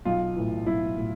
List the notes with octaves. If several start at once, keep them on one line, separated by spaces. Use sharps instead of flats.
B1 F4
A2 E3
B1 E4
A2